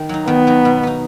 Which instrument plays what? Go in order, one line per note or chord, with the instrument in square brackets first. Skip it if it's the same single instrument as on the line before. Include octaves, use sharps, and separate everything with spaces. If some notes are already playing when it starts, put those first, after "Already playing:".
Already playing: [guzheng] D#3
F#3 D#4
[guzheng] D#3 [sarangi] B3
[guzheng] F#3 D#4
B2
B3 D#4